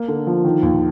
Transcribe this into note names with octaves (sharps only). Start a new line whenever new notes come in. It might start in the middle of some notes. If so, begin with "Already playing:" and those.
Already playing: A#3
D3
F3
D#3
D#2